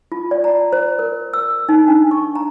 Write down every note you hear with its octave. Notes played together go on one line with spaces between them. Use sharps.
F4
D5
A#5
C5
A#4
E6
D#4
D4
C#6
A#5